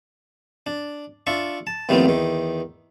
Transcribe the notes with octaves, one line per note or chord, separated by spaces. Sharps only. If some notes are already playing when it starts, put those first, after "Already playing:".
D4
D4 F4 E5 C#6
A5
D#2 A2 D#3 F3 B3 C4
E2 D#3